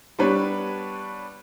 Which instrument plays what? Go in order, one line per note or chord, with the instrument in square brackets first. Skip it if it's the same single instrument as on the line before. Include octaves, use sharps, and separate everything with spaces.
[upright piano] G3 B3 D4 B4 C#5